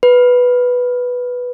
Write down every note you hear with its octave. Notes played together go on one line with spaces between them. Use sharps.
B4